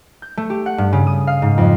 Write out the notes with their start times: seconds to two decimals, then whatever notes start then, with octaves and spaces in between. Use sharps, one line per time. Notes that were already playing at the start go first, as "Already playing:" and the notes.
0.22 G6
0.37 A3
0.50 G4
0.66 F#5
0.78 G2
0.93 C#3
1.07 D#6
1.27 F5
1.42 G#2
1.58 F2